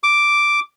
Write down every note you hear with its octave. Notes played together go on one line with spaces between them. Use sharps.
D6